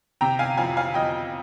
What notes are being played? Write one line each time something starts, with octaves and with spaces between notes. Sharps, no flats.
C3 G5 A#5
F5 G#5
F2 F5 G#5
F5 G#5
F2 D#5 G5